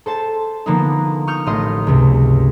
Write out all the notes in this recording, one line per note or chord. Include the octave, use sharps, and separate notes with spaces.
A4 C5 A5
D3 F3 A#3 B3 D4 D#4
C#6 D#6 F6 G6
A1 A3 D#5 C6 D#7
C#2 G2 C3